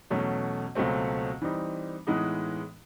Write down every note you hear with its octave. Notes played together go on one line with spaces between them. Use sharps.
E2 B2 F#3 A3 C#4
C#2 B2 F#3 A3 C4
E3 G3 C4 D#4
A2 E3 G#3 B3 D#4